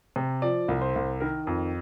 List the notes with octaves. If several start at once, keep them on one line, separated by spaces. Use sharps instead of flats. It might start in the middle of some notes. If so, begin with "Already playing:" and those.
C3
F3 D5
C2
C5
C2
D#3 A#4
F2